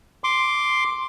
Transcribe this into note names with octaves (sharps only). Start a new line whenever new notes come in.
C6 D6